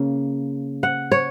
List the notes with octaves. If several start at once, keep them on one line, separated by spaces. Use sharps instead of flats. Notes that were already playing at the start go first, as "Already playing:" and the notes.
Already playing: C#3 A#3
F#5
C#5